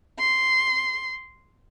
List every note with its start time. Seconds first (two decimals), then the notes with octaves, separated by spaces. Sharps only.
0.19 C6